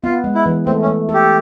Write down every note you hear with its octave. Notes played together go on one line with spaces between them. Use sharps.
B3 F4
G#3
E4
E3
A3 C4
C#4
A3
G4 A4